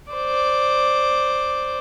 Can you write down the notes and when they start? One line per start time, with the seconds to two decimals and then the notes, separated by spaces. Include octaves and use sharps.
0.13 C5 D5